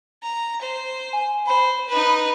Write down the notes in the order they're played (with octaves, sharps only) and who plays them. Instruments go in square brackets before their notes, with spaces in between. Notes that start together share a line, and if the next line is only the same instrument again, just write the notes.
[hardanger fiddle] A#5
C5
[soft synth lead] G#5
[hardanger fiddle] C5 [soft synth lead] B5
[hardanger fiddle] D#4 B4